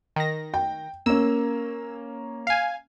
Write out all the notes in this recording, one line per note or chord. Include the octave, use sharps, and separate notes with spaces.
D#3 A#6
G5
A#3 C#4 E6
F5 G#5